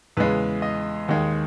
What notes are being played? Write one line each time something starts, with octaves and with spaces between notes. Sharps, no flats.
E2 C#3 G#3 B4
D#5
D#2 D#3 G#3